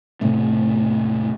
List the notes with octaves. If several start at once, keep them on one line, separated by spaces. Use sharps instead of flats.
E1 A2 C3 A3